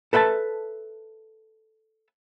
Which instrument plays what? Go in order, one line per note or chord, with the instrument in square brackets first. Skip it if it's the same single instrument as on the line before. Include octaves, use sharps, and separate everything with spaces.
[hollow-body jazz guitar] A4 B4 E5 G5 A5